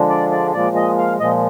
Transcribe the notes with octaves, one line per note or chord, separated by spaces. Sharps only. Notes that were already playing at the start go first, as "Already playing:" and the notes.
Already playing: D3 F3 G#3 D4
D5
D5
A#2 F3 G#3 D5
D#5
F5
A#2 F3 G#3 D#5